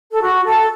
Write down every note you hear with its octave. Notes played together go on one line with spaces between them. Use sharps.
A4
F#4
A4